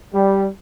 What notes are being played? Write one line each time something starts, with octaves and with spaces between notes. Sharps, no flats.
G3